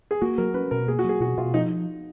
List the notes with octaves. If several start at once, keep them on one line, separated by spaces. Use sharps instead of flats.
G#4
A#3 F#4
F#3 A#4
C#4 B4
B2 A#4
A#3 G#4
F#4
F#3 G#4
B2 F#4
B2 F4
F3 D#4